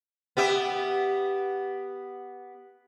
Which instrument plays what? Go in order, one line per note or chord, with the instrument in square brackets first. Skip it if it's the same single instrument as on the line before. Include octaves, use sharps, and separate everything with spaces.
[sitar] B3 G4 E5